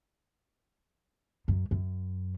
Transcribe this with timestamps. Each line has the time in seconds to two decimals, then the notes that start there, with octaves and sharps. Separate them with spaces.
1.48 F#2
1.71 F#2